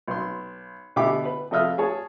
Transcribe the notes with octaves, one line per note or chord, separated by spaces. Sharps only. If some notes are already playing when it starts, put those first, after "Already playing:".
B1 C6
B2 D3 E4 G4 E5 D6
B4
F2 A4 D#5 E5 F6
G#4 C#5 A5